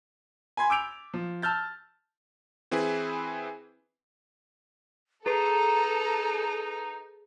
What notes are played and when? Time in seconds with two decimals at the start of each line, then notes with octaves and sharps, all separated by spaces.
0.57 G#5 B5 C6 G#6
0.70 D6 E6 G6 D7 F7
1.14 F3
1.42 A5 E6 F6 G6 A6
2.71 E3 C4 E4 G#4 B4
5.26 D#4 G#4 A4 B4 A#5